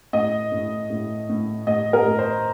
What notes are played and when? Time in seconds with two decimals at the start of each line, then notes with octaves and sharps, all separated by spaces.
0.13 A2 D#5
0.52 A2
0.90 A2
1.30 A2
1.67 A2 D#5
1.93 A#4
2.06 A2
2.19 C5